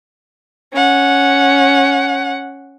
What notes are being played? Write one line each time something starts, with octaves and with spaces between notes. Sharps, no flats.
C#4 F#5